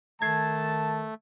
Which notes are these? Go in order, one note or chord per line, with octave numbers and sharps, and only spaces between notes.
D#3 A3 A5 G#6 C7